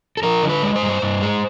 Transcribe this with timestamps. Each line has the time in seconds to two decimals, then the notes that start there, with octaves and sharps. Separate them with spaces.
0.17 A4
0.23 F3 A#4
0.43 D3
0.49 B4
0.63 G#3
0.76 C5
0.82 G2
1.02 G2
1.22 G#3